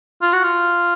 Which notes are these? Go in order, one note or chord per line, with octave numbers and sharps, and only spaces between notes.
F4
F#4
F4